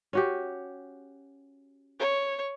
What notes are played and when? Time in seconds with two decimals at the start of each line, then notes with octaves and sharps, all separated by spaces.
0.13 C#4 F#4 G4
1.99 C#5